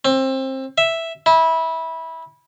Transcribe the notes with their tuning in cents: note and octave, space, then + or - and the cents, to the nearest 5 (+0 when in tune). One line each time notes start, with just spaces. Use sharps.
C4 +25
E5 +0
E4 -20